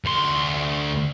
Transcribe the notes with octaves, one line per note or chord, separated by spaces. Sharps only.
D2 C6